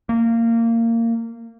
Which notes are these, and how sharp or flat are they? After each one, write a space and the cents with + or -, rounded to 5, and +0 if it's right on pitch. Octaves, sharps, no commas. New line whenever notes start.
A#3 -20